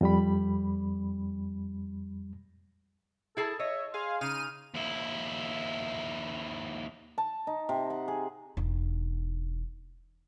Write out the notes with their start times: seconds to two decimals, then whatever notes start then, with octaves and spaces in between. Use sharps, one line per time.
0.01 F2 G3 B5
3.37 E4 G#4 A4 A5
3.59 C#5 D#5 E5
3.94 G#4 F5 C6
4.21 C#3 D#4 F6 D#7
4.75 D#2 E4
7.18 A5
7.47 D#4
7.69 C3
7.90 F#5
8.08 G#4
8.57 E1 D#4